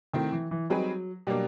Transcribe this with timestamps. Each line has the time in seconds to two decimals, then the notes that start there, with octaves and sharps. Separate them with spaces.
0.13 D#3 A3 C4 E4
0.32 E3
0.51 E3
0.70 F#3 G3 C4 D#4 G#4 B4
1.27 B2 F#3 G3 A#3 D4